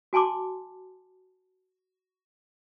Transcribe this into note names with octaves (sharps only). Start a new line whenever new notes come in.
F#4 G#5 A5 C6 D6